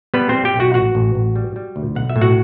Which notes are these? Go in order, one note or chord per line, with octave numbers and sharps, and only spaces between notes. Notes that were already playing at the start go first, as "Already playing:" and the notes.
G3 B3 B4
C4 C5
G3
G4 G5
B1
F#4 F#5
A1 F#4 F#5
A1
A1
G3
G3
D2
B1 F#5
E5
A2
F#4 F#5